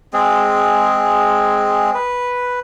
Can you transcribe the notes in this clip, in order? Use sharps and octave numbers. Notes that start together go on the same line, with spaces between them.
G#3 C4 G#4
B4